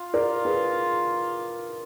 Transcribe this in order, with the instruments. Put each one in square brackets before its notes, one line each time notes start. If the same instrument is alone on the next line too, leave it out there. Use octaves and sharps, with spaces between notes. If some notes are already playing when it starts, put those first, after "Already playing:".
Already playing: [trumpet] F4
[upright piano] A#4 D5
G#4 B4